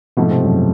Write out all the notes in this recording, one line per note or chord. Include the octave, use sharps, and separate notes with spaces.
G#2 B2 F3 A3 B3
C3 C4
F#2 F#3